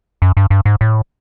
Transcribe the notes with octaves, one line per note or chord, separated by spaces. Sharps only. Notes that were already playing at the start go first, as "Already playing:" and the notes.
F#2
G2
G2
G#2
A2